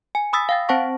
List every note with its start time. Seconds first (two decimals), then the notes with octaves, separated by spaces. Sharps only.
0.15 G#5
0.33 B5 D#6 E6 A6 B6
0.49 F5 G5 A6
0.69 C4 C5 F#5 A5 C#6 A#6